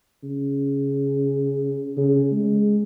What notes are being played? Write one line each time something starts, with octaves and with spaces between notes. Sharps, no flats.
C#3
C#3
G#3